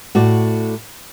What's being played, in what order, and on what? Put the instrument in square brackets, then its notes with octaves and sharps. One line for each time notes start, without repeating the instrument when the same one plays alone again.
[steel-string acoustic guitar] A2 F#4 D5